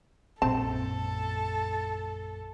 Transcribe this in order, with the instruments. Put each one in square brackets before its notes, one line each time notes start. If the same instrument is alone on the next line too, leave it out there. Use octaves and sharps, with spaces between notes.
[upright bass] A#1 F#2 [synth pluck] C4 [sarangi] A4 [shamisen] A5